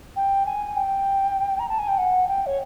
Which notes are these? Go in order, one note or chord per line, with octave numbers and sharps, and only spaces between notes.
G5
G#5
G5
A#5
A5
G#5
G5
F#5
G5
C#5